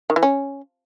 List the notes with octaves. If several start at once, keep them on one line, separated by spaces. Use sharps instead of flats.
D#3
E3
C#4